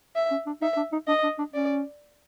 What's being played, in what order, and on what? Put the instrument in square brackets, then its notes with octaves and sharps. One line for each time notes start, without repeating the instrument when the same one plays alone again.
[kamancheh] E5
[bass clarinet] C#4
D4
[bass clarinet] D#4 [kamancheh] E5
[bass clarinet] D4
D#4
[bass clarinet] D4 [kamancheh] D#5
[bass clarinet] D4
D4
[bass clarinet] C#4 [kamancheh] D5